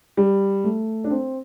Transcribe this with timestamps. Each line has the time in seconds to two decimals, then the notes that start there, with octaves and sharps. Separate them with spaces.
0.17 G3
0.64 A3
1.04 D4
1.11 C4